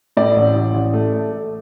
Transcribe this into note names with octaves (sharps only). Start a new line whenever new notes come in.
A2 D5
A1
A1
A1
A3
A3
A3